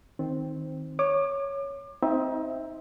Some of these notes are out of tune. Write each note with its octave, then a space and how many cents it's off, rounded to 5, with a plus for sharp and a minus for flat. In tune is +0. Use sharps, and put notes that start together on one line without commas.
D#3 +5 C4 +0
C#5 +0 D6 +35
C4 +0 D#4 +25 E5 +0